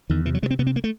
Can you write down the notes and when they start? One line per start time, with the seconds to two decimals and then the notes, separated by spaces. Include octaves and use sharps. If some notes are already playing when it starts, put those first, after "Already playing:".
0.10 E2 D#3
0.26 C3 E3
0.34 F#3
0.42 C3 G#3
0.51 C4
0.59 C3 B3
0.67 C4
0.76 A#3
0.84 A3